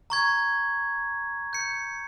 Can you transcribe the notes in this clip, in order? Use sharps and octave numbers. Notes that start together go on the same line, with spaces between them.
A#5 C#6 G#6
G6 C#7